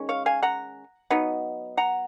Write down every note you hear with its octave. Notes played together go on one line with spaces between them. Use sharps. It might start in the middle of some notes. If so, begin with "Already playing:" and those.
Already playing: D#3 G#3 C#4
C#5 F5
F5 G#5
F#5 A#5
F#3 B3 D#4
F#5 A#5